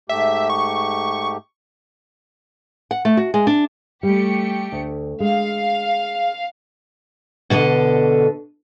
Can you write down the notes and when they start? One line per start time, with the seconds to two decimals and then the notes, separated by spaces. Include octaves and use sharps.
0.09 G#2 A3 G4 E5
0.50 C#6
2.91 F#5
3.05 A3
3.17 F#4
3.34 G#3
3.47 D4
4.03 G3 A3 G4 C#7
4.72 D2
5.20 G#3 F5
7.50 B2 D3 A4 D#5